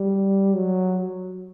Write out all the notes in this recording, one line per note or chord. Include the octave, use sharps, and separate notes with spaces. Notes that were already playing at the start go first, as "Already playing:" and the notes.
Already playing: G3
F#3